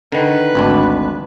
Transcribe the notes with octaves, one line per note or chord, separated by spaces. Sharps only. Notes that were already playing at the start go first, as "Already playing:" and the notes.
D3 D#3 B4
G#1 D2 D4